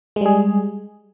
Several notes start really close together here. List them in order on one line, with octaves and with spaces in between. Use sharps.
G#3 G3 G#4